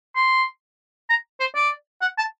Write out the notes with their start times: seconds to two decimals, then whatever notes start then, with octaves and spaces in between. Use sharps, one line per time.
0.16 C6
1.10 A#5
1.40 C5
1.55 D5
2.02 F#5
2.18 A5